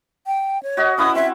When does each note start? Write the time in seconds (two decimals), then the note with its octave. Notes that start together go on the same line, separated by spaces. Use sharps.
0.27 G5
0.63 C#5
0.77 F#4 D#5 F#5
0.98 C#4 E4 B4 D#6
1.15 C4 E5